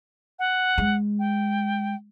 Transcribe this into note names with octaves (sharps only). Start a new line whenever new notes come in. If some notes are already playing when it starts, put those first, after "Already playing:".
F#5
G#3
G5